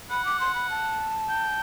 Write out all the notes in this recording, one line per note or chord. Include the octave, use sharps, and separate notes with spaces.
F#5 B5
D6
C6
B5
A5
G5